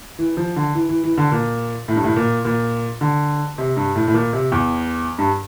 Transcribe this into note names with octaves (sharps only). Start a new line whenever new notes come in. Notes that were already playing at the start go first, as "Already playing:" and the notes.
E3
F3
D3
E3
E3
E3
D3
A#2
A2
G2
A2
A#2
A#2
D3
C3
G2
A2
A2
A#2
C3
E2
G2